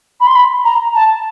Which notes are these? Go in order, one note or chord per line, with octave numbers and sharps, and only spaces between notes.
B5
C6
B5
A#5
A5